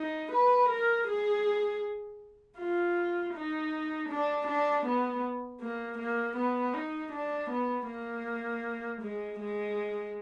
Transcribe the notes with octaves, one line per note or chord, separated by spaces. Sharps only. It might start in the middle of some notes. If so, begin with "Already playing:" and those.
Already playing: D#4
B4
A#4
G#4
F4
D#4
D4
D4
B3
A#3
A#3
B3
D#4
D4
B3
A#3
G#3
G#3